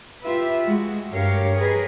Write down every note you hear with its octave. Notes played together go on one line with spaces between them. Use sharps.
F4 G4 B4 E5
G#3 F#4
G2 G4 A#4 C#5 F5
G#4 A#4 B4 D#5